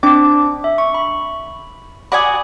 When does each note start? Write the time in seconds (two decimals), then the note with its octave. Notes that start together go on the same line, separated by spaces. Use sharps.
0.03 C4 D4 D6
0.64 E5
0.78 C#6
0.94 B5
2.12 F#4 D5 G#5 B5 D#6